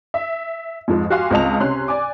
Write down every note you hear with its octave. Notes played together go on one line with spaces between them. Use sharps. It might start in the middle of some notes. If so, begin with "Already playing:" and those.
E5
F2 G#2 F3 G#3
F#4 G4 F5 G#5 C6
C#2 C4 F4 D#5 A5 F7
C3 C#4 C6 F#6
D5 G#5 D6